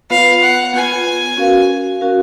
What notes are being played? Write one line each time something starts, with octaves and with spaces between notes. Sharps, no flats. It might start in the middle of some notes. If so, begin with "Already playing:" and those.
B3 F4 B4 F5
F#5
B3 F4 B4 G#5
C#4 F#4 A#4 F5
C#4 F#4 A#4 F5